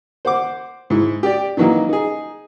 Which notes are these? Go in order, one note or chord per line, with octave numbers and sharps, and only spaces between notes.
C5 F#5 D6
G#2 E4
G4 D5
D#3 E3 F#3 A#3 D#4
D#4 G#4